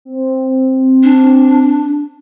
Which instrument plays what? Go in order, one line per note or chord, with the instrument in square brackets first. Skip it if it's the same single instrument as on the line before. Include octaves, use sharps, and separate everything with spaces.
[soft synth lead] C4
[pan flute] D4